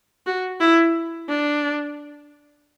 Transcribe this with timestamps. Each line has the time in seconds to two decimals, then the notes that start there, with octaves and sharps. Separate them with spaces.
0.27 F#4
0.60 E4
1.29 D4